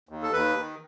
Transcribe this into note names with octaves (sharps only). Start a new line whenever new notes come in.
D#2
A4
D#2 B4
D#3